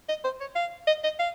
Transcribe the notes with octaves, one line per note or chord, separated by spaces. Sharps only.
D#5
C5
C#5
F5
D#5
D#5
F5